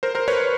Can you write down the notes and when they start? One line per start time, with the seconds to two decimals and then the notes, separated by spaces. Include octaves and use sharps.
0.03 A#4 C5
0.15 A#4 C5
0.28 B4 C#5